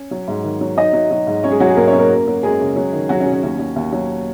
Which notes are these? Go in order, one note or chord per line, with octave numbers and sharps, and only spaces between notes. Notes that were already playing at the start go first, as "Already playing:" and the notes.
Already playing: C#4
F#3
G#2
D#3
F#3
F#3 D#4 D#5
F#3
F#3
G#2
F#3 C#4 C#5
G#3 G#4
F#3 F#4
G#3 G#4
G#2 A#3 A#4
C#4 C#5
F#3
A#3 A#4
F#2
F#3
F#2 G#3 G#4
C#3
F#3
D#3
D#3 F#3 F#4
C#4
F#3
C#4
D#2 C#4
F#3
D#2
F#3